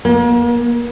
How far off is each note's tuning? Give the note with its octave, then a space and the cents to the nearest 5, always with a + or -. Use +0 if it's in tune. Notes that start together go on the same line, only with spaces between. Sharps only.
A#3 +40